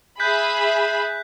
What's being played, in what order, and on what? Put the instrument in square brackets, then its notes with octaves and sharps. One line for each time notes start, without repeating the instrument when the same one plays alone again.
[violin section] G#4 E5 B5 [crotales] F#6 G6 B6